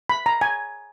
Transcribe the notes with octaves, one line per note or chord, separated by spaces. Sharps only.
B5
A#5
G#5